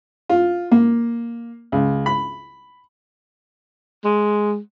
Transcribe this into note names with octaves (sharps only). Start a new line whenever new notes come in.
F4
A#3
C#2
B5
G#3